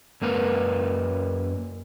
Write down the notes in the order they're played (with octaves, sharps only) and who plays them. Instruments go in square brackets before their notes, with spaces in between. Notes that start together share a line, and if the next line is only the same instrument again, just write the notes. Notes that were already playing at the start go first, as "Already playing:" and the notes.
[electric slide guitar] F#2 A#3 A#4 B4